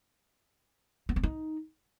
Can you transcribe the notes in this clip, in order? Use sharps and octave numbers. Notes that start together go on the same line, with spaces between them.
B3
C4
D#4